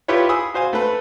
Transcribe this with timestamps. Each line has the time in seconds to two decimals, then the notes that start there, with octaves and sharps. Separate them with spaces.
0.08 E4 F4 G4 B4 C#5
0.29 G#4 B5 D#6 E6
0.54 F#4 C5 F5 G#5
0.73 A3 A4 B4